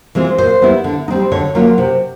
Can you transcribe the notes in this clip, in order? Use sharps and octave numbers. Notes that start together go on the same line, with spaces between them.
E3 G#3 C4 F4
A#2 C5
G3 B3 E4
D3
D#4
G3 C4
D3 C#5
F#3 A#3 C#4 F4
C3